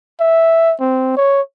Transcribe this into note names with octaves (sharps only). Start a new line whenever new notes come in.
E5
C4
C#5